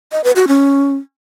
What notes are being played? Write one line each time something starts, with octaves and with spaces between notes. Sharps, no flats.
D#5
B4
F#4
C#4